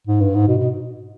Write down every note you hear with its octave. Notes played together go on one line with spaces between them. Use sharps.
G#2
G2
G#2
B2
B2